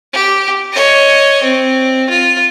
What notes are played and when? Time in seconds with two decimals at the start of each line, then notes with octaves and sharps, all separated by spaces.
0.13 G4
0.72 C#5 D#5
1.43 C4
2.10 F4